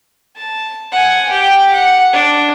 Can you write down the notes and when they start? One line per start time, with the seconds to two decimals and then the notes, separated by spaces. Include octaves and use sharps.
0.36 A5
0.92 F#5 G#5
1.29 G4 G5
1.73 F#5
2.13 D4